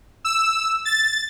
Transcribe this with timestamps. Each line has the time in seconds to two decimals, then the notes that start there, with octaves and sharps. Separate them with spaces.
0.25 E6
0.85 A6